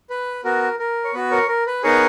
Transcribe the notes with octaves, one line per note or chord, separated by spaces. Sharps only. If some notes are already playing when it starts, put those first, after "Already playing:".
B4
B3 F#4 A#4
A#4
C#5
B3 F#4 B4
A#4 C#5
A#4
B4
B3 D#4 G#4 A#4 C#5